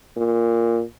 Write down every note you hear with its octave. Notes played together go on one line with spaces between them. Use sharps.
A#2